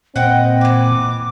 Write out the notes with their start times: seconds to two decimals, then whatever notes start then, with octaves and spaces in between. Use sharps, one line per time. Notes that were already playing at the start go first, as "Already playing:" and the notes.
0.16 A#2 C4 B4 D#5 F#5 G5
0.61 E3 B4 D6